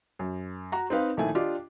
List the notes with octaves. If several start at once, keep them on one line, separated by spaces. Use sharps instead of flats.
F#2
F#4 A#5
C4 D#4 B4 F5
A#1 D#3 A3 E4 G#5
D4 F4 G4 D#5